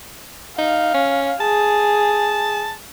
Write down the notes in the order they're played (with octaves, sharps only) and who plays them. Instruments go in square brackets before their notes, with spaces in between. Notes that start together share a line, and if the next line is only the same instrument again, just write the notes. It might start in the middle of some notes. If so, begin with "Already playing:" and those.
[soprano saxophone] D#4 [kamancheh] F5
[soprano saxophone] C#4
[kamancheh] G#4 [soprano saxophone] A5